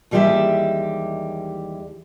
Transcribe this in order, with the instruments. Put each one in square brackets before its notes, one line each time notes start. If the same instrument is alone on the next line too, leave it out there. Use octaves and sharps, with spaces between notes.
[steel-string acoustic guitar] D#2 E3 G3 G#3 G4 E5